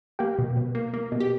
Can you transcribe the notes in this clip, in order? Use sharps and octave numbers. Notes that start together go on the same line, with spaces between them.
A#3 G4
B2
B2
A#3
A#3
B2
G4